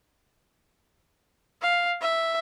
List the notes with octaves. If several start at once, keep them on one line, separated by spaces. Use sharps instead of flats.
F5
E5